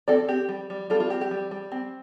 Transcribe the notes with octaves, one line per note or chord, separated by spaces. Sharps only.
C4 A4 D5
C4 G4
G3
G3
G3 F4 A4
F4
C4 G4
G4
G3
G3
C4